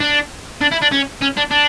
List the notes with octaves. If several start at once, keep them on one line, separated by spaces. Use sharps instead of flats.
D4
D4
E4
D4
C#4
C#4
D4
D4